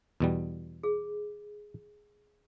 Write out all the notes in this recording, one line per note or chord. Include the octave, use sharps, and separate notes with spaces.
E2 B2 G3
G#4